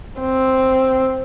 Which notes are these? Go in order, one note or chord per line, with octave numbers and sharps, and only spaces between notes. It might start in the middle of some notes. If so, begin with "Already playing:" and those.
C4